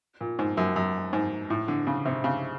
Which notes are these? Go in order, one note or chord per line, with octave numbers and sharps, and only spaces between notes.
A#2
G#2
F#2
F#2
G#2
A2
D3
C#3
C3
C#3